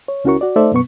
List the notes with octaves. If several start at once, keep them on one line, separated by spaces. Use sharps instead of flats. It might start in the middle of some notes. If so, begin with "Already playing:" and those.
C#5
C#2 C#4 E4 F#4 A#4 C#6
F#4 D5
A3 D#4 A4 C5 D5 E5
F#2 B2 B3 C#6